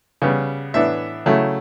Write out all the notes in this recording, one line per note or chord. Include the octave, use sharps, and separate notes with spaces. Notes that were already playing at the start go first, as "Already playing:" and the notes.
C#3 G3 B3
A2 E3 B3 D4 E5
C#3 F#3 A3 E4